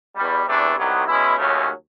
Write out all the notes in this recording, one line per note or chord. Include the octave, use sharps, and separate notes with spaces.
E2 B2 G3
E2 C3 E3 A3 D4
C2 C3 D#3 F#3 B3
B2 G#3 C#4 E4
D#2 C#3 F#3 A3 C#4